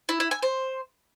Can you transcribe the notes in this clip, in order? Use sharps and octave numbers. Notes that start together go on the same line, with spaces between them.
E4
E4
G#5
C5